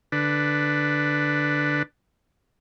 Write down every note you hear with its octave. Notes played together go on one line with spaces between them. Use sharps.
D3 D4 B4